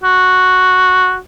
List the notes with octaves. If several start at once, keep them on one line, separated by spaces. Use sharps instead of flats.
F#4